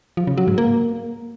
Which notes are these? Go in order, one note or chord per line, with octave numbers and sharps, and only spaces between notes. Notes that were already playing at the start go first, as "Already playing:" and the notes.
F3
C#3
F#3
G#2
A#3